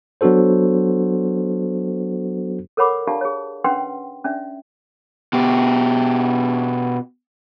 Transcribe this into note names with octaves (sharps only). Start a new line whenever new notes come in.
F#3 B3 D4 F#4 A4 C5
A4 A#4 C#5 F#5 B5 D6
D4 F4 G4 D5 F5 A5
G#4 C#5
C#4 D4 B4 F#5 G5 C6
C#4 D4 D5 E5
B2 G4